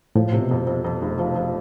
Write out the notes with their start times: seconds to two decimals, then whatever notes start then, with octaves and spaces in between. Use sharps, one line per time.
0.16 A2 F3
0.33 C3
0.42 B2
0.51 F2
0.67 F2
0.84 F2
1.02 F1
1.19 F3
1.36 F3